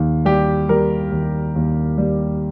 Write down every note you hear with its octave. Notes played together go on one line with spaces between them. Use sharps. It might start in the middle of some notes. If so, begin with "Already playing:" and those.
Already playing: D#2 D#3
G3 G4
G3 A#4
D#2
D#2
G3